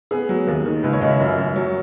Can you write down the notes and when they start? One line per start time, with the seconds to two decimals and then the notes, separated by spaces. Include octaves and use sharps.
0.11 B3 G#4
0.29 F#3
0.47 D#2
0.65 D#3
0.83 C#2 B4
0.93 C#5
1.01 C#2 D#5
1.10 E5
1.19 F#2
1.37 F#2
1.56 F#3 C#5